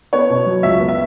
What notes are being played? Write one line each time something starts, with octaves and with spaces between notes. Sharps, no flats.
B3 C#5
B2
F#3
C#2 E5
B3
E5